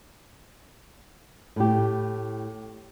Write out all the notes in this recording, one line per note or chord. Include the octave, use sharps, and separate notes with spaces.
A2 G4